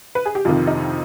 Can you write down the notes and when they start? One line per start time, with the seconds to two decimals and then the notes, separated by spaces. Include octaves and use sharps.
0.15 B4
0.25 G#4
0.35 G4
0.45 F2 C3 D#3 F4
0.67 D#4